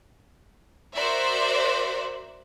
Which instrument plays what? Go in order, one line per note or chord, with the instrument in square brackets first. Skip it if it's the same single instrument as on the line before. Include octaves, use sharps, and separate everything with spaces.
[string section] F#4 A#4 C5 D5 E5